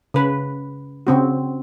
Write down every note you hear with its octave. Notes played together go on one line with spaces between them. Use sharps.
C#3 B4
C#3 C4 F#4